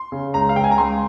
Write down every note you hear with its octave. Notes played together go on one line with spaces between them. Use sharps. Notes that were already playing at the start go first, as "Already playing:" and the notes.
Already playing: C6
C#3
C#2 A#5
F5
C#2 G5
G#5
A#5
C#2 C6